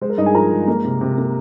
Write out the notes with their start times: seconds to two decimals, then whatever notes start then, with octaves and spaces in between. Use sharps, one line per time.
0.01 G#3 C5
0.10 A#4
0.18 G2 D#4 D#5
0.26 G#4 G#5
0.35 F3 A#4 A#5
0.51 G#3
0.67 A#3
0.84 C3
1.01 C3
1.18 A#3